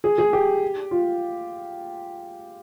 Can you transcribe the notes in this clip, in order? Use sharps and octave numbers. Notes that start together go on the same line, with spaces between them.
G#4
G#4
G4
F4